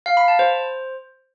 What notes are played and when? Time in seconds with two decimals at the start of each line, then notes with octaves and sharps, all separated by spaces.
0.06 F5
0.17 B5
0.28 A5
0.39 C5